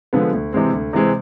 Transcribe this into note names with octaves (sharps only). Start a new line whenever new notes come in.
D3 F3 G#3 B3
D2
C3 E3 G#3 C4
D2
C3 E3 G#3 C4